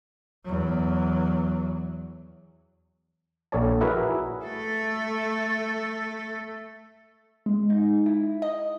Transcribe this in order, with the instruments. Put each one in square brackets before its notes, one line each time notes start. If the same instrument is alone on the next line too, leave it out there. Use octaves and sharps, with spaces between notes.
[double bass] E2 F#3
[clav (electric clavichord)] A#1 A4 C#5 D5 A5
E4 F#4 G#4 A#4 B4 E5
[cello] A3 A4
[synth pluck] G#3
D#4
E4
D#5